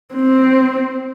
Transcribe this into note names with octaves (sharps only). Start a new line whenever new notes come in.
C4